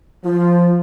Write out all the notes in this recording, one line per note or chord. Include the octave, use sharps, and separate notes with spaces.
F3 F4